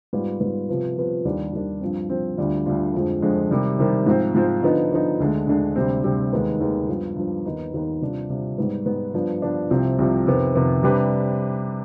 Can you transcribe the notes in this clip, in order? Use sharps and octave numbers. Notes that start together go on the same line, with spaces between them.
G#2 G3 B3 F4
G#2 G3 B3 F4
C3 F3 B3 F4 B4
C3 F3 B3 F4 B4
D#2 D#3 G3 D4
D#2 D#3 G3 D4
G2 F3 C4
G2 F3 C4
D2 D3 G3 D4 F4
D2 D3 G3 D4 F4
F2 D3 F3 G#3
F2 D3 F3 G#3
C3 D#3 G3
C3 D#3 G3
G#2 F3 C4 F4
G#2 F3 C4 F4
D3 F3 B3 D#4
D3 F3 B3 D#4
D2 D3 G#3
D2 D3 G#3
D2 C3 G3 C4
D2 C3 G3 C4
D#2 D#3 G#3 B3 D#4
D#2 D#3 G#3 B3 D#4
G2 F3 B3
G2 F3 B3
D#2 D#3 B3 D#4 B4
D#2 D#3 B3 D#4 B4
C3 G3 D4 F4
C3 G3 D4 F4
G#2 G3 B3
G#2 G3 B3
G2 F3 B3 D4
G2 F3 B3 D4
C2 C3 F3 C4
C2 C3 F3 C4
F2 C3 D#3 B3
F2 C3 D#3 B3
C3 G3 D4 G4 B4